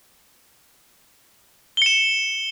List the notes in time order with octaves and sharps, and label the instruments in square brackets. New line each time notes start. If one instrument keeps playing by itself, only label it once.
[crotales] G7
C#7
E7